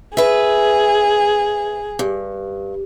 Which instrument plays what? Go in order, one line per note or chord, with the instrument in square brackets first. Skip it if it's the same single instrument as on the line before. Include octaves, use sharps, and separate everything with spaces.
[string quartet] G#4 [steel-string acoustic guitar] B4 E5
[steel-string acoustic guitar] G2